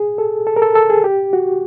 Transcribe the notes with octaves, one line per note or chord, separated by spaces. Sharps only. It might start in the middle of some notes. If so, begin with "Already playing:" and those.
Already playing: G#4
A4
A4
A#4
A4
A4
G#4
G4
F#4